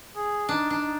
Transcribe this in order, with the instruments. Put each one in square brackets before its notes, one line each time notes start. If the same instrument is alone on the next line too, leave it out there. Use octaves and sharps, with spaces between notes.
[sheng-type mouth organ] G#4
[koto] D4 [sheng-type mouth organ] D#4
[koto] D4
[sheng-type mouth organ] D#4